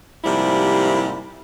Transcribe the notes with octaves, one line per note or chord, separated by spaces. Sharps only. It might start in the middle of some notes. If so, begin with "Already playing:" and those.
G#2 C3 F3 G3 A#3 E4